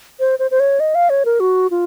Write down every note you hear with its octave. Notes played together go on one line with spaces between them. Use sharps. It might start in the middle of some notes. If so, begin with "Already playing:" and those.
C5
C5
C5
C#5
D#5
F5
C#5
A#4
F#4
F4